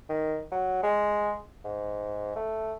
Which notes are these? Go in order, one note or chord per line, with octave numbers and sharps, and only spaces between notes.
D#3
F#3
G#3
G#2
A3